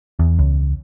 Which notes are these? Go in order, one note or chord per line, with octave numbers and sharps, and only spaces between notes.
E2
C#2